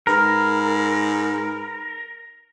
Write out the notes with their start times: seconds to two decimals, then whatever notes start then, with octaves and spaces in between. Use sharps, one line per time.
0.07 G#2 A#4 B4 B5 F6